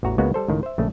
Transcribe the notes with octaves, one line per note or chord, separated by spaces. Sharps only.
A1 E2 F#4 A#5
C#2 G#3 A#3 B3 F#4 F#5
G3 A4 C5
C#2 A2 D#3
C5 E5
A#1 C#3 A3